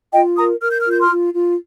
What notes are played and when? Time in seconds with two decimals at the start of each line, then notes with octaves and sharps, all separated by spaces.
0.12 F4 D#5 G5
0.37 A#4 A#5 D#6
0.61 A#4 F6
0.71 G6
0.81 F6
0.86 F4 G6
1.00 C6 F6
1.09 F4
1.34 F4